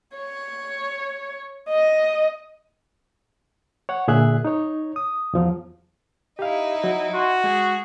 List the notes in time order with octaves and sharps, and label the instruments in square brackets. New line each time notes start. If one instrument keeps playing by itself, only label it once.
[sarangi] C#5
D#5
[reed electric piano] C#5 F#5
A#2 D3 G#4 E5 F#6
D#4 C#5
D#6
E2 F3 F#3
[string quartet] D#4 E4 [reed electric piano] G4 F5
[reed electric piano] F#3
[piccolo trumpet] F#4 [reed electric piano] C6
[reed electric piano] G#3 [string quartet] G#4